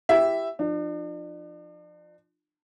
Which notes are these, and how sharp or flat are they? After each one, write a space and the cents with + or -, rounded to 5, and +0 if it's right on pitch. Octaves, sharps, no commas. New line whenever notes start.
E4 +20 G4 +0 E5 +0
F3 +0 D4 +40